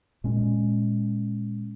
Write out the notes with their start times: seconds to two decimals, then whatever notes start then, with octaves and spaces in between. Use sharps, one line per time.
0.24 A#2 G#3 C#4